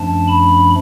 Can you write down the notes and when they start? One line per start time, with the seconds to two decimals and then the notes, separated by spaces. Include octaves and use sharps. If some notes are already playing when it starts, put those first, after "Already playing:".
Already playing: F#2 F3 A3 D4 A5
0.27 B5